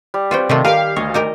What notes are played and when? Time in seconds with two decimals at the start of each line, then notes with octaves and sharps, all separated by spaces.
0.14 G3
0.31 C4 F4 F#4 B4 G5
0.49 C3 D#3 A3 F4
0.65 G4 A#4 B4 F5
0.96 D2 C#5 D#5
1.14 D#4 G4 A#4